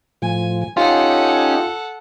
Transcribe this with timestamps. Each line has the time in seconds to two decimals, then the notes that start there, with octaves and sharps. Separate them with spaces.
0.22 A2 F3 G#5
0.77 C#4 D#4 F4 G4 A4 F#5